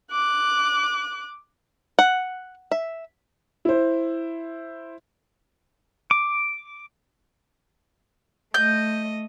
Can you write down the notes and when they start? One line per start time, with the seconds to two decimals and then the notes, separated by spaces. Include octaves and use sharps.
0.11 D6 F#6
1.99 F#5
2.71 E5
3.65 E4 C5
6.11 D6
8.54 A3 D#5 G6